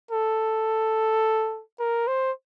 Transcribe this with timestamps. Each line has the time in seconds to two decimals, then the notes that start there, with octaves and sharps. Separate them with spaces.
0.11 A4
1.80 A#4
2.07 C5